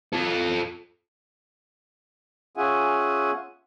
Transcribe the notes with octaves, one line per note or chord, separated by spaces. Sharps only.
F4 A4
C#4 F4 G#4 E5 F#5 G#5